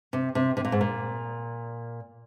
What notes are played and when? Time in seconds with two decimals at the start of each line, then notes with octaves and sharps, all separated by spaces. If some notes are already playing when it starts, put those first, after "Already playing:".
0.13 C3
0.35 C3
0.57 C3
0.65 A#2
0.72 G#2
0.81 A#2